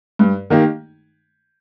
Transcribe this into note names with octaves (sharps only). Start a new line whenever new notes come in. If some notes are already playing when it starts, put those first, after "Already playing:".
G2
D#3 A#3 D#4 G4